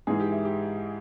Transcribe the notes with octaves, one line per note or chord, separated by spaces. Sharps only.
G#2 E3 G#3 G#4
G4
E4
G4